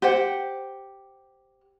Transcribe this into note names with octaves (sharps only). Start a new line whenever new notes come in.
G4 C5 F#5